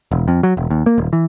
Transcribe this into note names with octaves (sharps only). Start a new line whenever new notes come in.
E1
F2
F#3
E1
D#2
A#3
D#1
E3